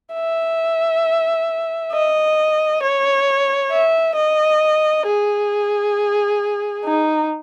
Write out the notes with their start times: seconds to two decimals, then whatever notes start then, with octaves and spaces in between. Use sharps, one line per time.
0.14 E5
1.92 D#5
2.82 C#5
3.71 E5
4.16 D#5
5.06 G#4
6.84 D#4